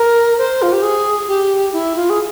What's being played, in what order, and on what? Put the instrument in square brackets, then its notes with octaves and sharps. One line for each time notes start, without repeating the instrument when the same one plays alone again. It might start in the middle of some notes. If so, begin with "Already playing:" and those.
Already playing: [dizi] A#4
C5
F4
G4
G#4
G4
E4
F4
G#4